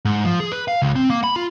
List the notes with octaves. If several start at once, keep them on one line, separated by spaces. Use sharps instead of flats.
G#2
F3
G#4
B4
F5
C#2
C4
A#3
B5
F4